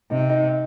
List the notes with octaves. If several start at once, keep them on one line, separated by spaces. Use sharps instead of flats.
C3 D#4
D#4